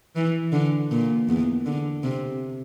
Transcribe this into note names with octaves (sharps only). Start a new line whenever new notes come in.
E3
D3
A#2
E2
D3
C3